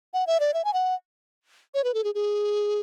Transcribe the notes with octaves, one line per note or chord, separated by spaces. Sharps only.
F#5
E5
D5
E5
G#5
F#5
C#5
B4
A4
G#4
G#4